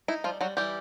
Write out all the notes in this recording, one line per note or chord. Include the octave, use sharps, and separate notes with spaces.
D#4 E4
F3 G3 F4
F#3 G3 F#4
E3 G3 G4